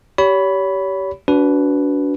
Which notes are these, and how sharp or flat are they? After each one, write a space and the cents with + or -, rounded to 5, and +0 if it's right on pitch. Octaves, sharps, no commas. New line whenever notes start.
G4 -15 C#5 +35 B5 +0
D4 -35 F#4 +0 B4 +0